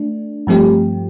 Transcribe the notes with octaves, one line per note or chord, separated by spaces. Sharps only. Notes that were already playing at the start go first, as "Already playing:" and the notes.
Already playing: A3 D4
G2 F3 A3 C4 G4